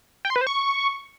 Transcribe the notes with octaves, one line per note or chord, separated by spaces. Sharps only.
G5
C6
B4
C5
C#6